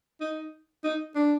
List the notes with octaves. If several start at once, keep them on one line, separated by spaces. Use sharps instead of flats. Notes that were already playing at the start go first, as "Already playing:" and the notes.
D#4
D#4
D4